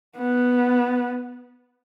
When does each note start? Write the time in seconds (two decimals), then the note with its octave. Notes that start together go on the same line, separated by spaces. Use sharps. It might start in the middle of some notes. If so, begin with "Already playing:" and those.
0.18 B3